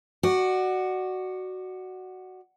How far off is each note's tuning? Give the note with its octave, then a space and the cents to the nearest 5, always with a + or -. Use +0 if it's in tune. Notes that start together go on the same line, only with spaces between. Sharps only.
F#4 +5 D5 +30